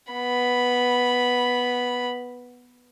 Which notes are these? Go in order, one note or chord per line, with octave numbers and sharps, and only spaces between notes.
B3 B5